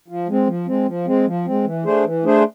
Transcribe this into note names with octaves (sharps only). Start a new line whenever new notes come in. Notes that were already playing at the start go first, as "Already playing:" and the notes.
F3
G#3 C4
F3
G#3 C4
F3
G#3 C4
F3
G#3 C4
E3
A3 D4 G#4 C5
E3
A3 D4 G#4 C5